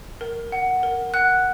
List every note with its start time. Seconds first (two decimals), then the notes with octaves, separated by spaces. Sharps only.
0.21 A#4
0.52 F#5
0.83 A#4
1.14 F#5 F#6